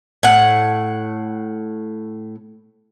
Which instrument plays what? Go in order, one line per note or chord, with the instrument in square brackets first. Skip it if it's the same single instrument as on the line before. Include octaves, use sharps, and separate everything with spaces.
[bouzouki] A2 F#5